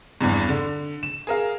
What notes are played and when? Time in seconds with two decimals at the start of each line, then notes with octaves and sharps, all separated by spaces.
0.21 G#1 E2 G2
0.49 D3
1.03 E7
1.27 G#4 A#4 F5